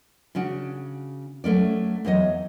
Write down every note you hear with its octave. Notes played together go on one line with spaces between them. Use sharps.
C#3 C#4 D4 F#4
F#3 A3 C#4 D5
E2 F#3 C#5 D#5